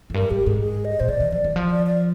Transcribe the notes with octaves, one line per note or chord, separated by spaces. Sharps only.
F2
G2 A#4
G#2 G4
G#2 G#4
G#4
D#5
A#2 C5
C3 D5
D#3
F3 D5
D#3
F3
D5
D5